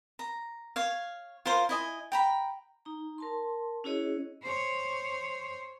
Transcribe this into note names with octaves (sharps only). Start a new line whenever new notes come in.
A#5
C#5 F5
F4 A#4 C5 F5
E4 D#5 G#5
G5 A#5 B5
D#4 A#5
A#4 A5 C6
C#4 E4 F#4 G#4 C#5 D#5
C5 C#5